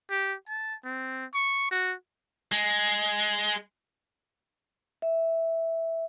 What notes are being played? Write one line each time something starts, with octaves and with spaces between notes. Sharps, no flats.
G4
A5
C4
C#6
F#4
G#3
E5